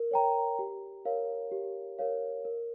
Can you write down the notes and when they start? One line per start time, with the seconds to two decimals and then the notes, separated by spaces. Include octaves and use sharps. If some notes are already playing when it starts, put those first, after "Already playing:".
Already playing: A#4
0.11 C#5 G5 A#5
0.59 G4
1.05 A#4 C#5 F5
1.52 G4
1.99 A#4 C#5 F5
2.45 A#4